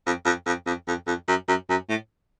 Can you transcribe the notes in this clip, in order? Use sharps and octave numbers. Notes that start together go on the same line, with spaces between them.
F2
F2
F2
F2
F2
F2
F#2
F#2
F#2
A2